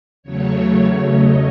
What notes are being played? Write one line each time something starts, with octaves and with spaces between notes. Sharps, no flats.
E2 C#3 F#3 A3 C#5
D#5